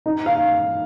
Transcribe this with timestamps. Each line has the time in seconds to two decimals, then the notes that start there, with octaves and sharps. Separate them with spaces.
0.06 D#4
0.26 F5